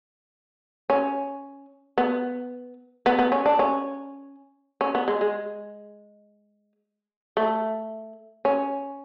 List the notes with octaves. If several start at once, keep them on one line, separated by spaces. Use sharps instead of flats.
C#4
B3
B3
B3
C#4
D4
C#4
C#4
B3
G#3
G#3
A3
C#4